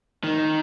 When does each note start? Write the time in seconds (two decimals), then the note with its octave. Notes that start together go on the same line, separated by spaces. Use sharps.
0.24 D#3